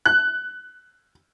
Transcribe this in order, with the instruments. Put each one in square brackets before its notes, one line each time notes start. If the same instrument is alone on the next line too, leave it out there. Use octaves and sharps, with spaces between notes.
[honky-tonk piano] F#6